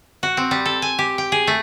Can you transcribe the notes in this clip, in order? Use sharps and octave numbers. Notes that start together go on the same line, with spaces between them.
F#4
C4
G3
A4
G#5
G4
G5
G#4
A3